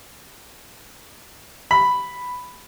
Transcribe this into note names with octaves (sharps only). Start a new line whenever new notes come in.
B5